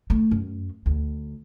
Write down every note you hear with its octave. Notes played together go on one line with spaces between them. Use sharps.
A3
F#2
D2